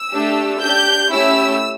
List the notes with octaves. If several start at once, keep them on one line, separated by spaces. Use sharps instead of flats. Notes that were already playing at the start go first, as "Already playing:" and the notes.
Already playing: E6
A3 D4 G4
D4 G4 G6
A3 C#4 E4 G4 E6